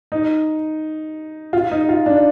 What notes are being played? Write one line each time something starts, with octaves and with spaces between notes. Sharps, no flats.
D#4
F4
D#4
F4
D4